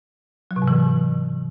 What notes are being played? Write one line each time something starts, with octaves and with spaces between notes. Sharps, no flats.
F#3
C3
G#2
E3